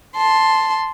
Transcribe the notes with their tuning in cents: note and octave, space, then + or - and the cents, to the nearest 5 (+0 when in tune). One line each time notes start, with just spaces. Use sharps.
A5 +0 C6 +0